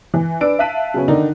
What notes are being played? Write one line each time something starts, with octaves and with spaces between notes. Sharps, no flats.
E3
D4 B4 E6 D7
E5 F5 A5 F#6 B6 D#7
C#3 F#3 B3 C#4
D3 D#3 D4 D#4